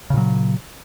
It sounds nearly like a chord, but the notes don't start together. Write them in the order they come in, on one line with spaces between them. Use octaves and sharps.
C#3 A#2 F#3